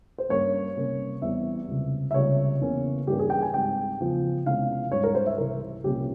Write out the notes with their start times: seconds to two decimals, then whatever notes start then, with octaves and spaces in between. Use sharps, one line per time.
0.18 C5
0.29 G2 G3 A#3 C#4 C#5
0.76 C3 G3 A#3 C#4
1.22 E2 E3 G3 C4 E5
1.68 C#2 C3 G3
2.11 E5
2.14 C#2 C3 G3 A#3 C#5
2.60 E2 C#3 E3 A#3 C#4
3.07 G2 E3 A#3 C#4 G4
3.19 G#4
3.30 G5
3.42 G#5
3.54 G#2 G3 C4 G5
4.00 E2 C#3 F3
4.46 E2 C3 E3 G#3 C#4 F5
4.92 G#2 G3 C#4 C#5
5.04 A#4
5.15 C5
5.27 E5
5.38 C2 C3 E3 A#4
5.84 C2 A#2 F3 A#3 C#4 G4